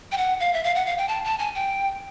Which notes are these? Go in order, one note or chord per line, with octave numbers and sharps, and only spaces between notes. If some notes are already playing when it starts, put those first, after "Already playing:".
G5
F#5
F5
E5
F5
F#5
F5
G5
A5
A5
G#5
G5